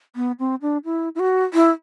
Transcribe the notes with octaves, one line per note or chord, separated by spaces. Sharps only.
B3
C4
D4
E4
E4
F#4
E4